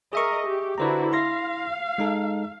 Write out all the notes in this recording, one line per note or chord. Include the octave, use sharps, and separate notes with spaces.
G#4 A#4 D#5 E5 C#6
G4
D3 E4 F#4 B4 C5 A#5
E4 F5 C6 A#6
G#3 D#4 A4